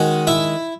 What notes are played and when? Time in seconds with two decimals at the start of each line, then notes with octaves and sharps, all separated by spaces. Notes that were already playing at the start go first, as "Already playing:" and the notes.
Already playing: D#3 G#3 C#4 F#4 F#5
0.27 E4 E5